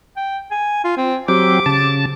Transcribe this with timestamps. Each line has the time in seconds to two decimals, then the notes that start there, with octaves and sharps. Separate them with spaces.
0.17 G5
0.51 G#5
0.84 F4
0.97 C4
1.28 F#3 C4 G4 D6
1.66 C#3 A5